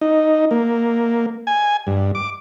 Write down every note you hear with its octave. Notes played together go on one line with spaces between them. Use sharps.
D#4
A#3
G#5
G2
D6